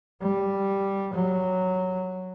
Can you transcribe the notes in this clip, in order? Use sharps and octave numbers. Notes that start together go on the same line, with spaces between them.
G3
F#3